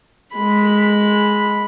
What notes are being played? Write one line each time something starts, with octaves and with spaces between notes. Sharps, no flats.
G#3 B5